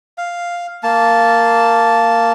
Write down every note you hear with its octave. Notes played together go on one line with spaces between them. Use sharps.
F5
A#3 A5